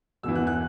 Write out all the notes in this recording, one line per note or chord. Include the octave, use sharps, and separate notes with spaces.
E1 E2 E3 E6
F#6
F#6